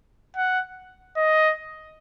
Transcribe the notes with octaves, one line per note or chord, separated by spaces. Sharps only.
F#5
D#5